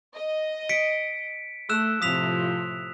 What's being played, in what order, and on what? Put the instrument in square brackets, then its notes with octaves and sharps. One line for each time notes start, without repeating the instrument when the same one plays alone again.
[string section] D#5
[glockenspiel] B6 C#7 D7
[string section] A3 [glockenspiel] E6 F#6 E7
[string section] A2 C3 F3 [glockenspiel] D#6 B6 F7